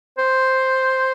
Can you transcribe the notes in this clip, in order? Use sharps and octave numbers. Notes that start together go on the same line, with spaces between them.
C5